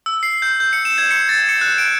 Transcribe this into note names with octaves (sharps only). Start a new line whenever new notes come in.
E6
C7
G6
G6
C#7
E7
G#6
C#7
A6
C#7
F#6
D7